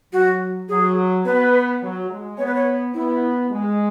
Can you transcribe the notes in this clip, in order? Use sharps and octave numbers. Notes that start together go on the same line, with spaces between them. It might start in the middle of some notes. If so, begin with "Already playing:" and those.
F#3 F#4
F#3 G#4
B3 B4
F#3
G#3
B3 C#5
B4
C#5
B3 E4
G#3